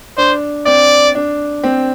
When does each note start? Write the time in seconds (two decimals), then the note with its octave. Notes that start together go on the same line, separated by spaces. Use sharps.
0.18 D4 C5
0.66 C4 D5
1.15 D4
1.64 C4